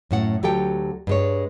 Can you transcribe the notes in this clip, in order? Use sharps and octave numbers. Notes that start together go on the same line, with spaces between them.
F#2 A2 F#5
D2 F#3 G4 A4 G5
G2 G#3 C#5